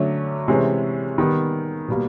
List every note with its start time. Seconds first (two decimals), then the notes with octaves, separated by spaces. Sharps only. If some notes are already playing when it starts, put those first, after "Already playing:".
Already playing: D3 F#3 A3 C#4
0.48 C3 E3 G#3 C#4
1.18 D#3 G3 B3
1.88 B2 G3 A#3